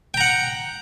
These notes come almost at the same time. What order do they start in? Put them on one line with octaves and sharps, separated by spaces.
G5 A#5 F#5